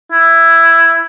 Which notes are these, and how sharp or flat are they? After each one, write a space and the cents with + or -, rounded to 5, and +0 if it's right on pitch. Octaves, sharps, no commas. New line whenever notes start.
E4 +10